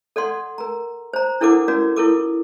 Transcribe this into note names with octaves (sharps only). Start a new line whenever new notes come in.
A4 D5 F#5 C6
A#4 A#5
C5 A#5
D4 E4 A4 A#4 F#5 D6
C#4 F#4 A#4 D5
E4 F4 A4 A#4 D6